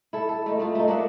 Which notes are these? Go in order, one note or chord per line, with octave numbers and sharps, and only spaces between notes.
E4 A4
A4
A3 D#4
A3 C4 F4
A3 D#4
A#3 D4 E5 F#5